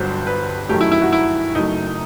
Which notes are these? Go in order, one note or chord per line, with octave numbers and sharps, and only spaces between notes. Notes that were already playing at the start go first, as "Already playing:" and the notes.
Already playing: G1 G2 F#3 C5
B4
F#2 D#3 F#3 A3 G4
E4
E4
F#4
E4
F#1 F#2 F#3 A3 D#4